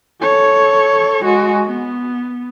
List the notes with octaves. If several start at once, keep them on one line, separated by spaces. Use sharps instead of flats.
A4 C#5
G#3 F#4
B3